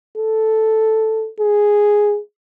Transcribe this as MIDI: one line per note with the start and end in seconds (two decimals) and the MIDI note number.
0.18 1.29 69
1.40 2.19 68